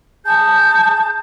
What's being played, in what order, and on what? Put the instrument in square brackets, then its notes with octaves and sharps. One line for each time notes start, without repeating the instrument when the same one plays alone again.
[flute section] G#4 A5 G6